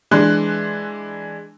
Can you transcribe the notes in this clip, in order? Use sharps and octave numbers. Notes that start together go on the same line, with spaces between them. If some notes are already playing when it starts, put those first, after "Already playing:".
E3 G#3 D4 C6 F#6